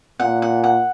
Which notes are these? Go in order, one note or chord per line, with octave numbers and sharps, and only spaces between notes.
A#2 F#5
F#5
F#5